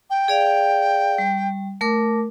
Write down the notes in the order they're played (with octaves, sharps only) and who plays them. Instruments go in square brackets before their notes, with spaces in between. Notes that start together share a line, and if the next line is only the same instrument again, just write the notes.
[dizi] G5
[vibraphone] G#4 D5 F5
G3
A3 A#4 D6